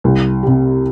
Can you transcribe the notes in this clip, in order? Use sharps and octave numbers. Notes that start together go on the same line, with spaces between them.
C2
C3 G3